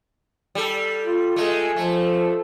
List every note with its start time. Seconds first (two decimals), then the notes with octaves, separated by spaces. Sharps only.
0.55 G3 A4
1.05 F4
1.36 G#3 A3
1.76 F3 A3